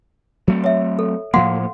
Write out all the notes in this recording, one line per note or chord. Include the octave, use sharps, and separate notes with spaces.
F#3 A3 C4
C#5 E5
A4
A2 F3 A#3 F5 F#5 C6